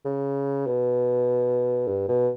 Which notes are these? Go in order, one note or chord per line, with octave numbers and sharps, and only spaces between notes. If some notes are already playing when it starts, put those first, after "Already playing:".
C#3
B2
G2
B2